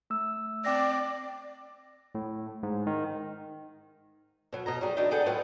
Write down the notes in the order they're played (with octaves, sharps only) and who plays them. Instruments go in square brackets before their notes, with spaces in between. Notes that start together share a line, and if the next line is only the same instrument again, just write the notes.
[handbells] A3 E6
[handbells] C4 G5 A#6 [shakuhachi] D5
[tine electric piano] A2
G#2
D#3
[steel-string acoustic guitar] B2 F#3
B2 D#5 A#5
F#3 G3 G#4
D3 F#3 B3 D4 D#4
B3 D4 G#4 A4 F#5 G5
A2 F#3 F4 B4 F#5 G5